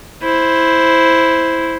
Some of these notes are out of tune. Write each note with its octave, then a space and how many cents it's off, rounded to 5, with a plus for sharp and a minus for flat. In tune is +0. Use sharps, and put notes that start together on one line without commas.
E4 +0 C5 +0